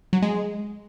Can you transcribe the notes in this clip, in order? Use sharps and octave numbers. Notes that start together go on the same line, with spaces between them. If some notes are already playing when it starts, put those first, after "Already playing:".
F#3
G#3